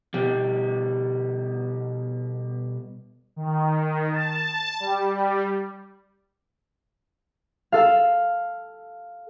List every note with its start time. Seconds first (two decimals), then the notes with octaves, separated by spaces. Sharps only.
0.14 B2 G3
3.36 D#3
4.12 A5
4.80 G3
7.72 A4 F5